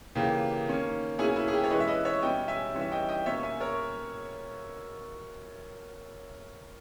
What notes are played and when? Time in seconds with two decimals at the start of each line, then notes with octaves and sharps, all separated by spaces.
0.15 C#3 E3 A#3 G4
0.67 D#3 A#3 C#4
1.19 B2 A#3 C#4 E4 G#4
1.36 E4
1.48 G#4
1.53 G4
1.64 C#5
1.70 E3 G#3 C#4 B4 D#5
1.80 E5
1.87 B4 D#5
2.05 C#5 E5
2.22 B2 G3 C#4 D#5 G5
2.48 E5 G#5
2.75 E3 G3 C#4
2.81 E5
2.92 D#5 G5
3.08 D#5 G5
3.26 B2 A#3 C#4 C#5 E5
3.43 E5 G#5
3.60 A#4 C#5